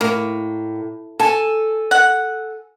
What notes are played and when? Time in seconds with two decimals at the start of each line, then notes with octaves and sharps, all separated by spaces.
0.01 A2 A#3
1.19 A4 G#5 A5
1.91 F#5